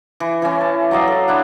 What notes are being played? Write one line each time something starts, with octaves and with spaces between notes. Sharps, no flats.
E3
E3 C#4
A5
F#3 D5 D#5 F5
A4
D4 E4 F#5